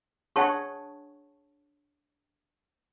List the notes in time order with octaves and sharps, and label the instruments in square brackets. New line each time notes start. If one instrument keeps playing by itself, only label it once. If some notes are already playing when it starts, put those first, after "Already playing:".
[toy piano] D4 A5 C#6 [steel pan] G#4 C#5 F#5